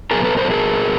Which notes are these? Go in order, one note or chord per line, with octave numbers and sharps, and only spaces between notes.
A#2 F#3 B3 G#4 A#4
A4 B4
A#4 C5
A4
G#4 A#4